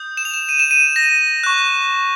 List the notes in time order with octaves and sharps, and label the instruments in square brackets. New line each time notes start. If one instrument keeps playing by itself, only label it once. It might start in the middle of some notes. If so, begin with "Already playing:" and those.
Already playing: [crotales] D#6 G6
E7
F7
E7
D#7
E7
D#7
A#6
C#6 F#6